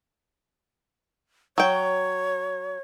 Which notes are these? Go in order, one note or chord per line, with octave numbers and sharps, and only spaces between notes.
F#3 C#5 G5